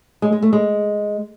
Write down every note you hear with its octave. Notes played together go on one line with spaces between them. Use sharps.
G#3
G#3
A3
G#3